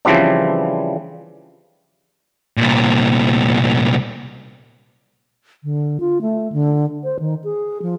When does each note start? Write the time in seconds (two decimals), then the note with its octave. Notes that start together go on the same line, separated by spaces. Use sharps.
0.05 C#3 E3 F3 G3 C4 D4
2.57 C2 A#2
5.64 D3
6.00 F4
6.21 A3
6.52 D3
7.04 C5
7.19 D#3
7.44 G#4
7.82 F3